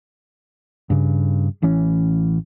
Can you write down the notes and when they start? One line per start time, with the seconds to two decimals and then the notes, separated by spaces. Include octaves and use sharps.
0.90 G2 C#3
1.62 A1 E3 C#4